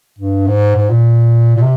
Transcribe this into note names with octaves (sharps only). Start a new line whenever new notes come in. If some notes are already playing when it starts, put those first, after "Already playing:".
G2
G#2
G#2
A#2
A#2
C3